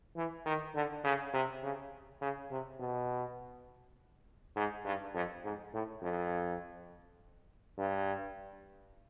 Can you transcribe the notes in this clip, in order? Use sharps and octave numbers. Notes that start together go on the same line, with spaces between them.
E3
D#3
D3
C#3
C3
C#3
C#3
C3
B2
G#2
G2
F2
G#2
A2
F2
G2